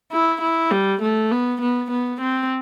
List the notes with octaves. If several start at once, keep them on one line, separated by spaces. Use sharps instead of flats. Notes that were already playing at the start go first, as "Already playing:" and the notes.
E4
E4
G3
A3
B3
B3
B3
C4